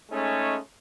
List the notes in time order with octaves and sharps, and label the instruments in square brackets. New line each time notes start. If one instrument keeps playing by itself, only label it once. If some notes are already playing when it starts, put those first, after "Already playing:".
[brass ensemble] G#3 A3 C#4 D#4